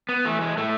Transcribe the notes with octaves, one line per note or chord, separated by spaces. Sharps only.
B3
E3 A3
G#3
A2 A3